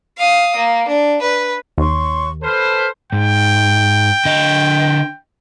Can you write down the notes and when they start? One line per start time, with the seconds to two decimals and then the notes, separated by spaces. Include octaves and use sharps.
0.17 F5 D#6
0.56 A#3
0.88 D4
1.21 B4
1.78 D#2 C#5 C6 C#6
2.43 A4 B4 C5 F6
3.12 G#2 G5
4.25 D3 D#5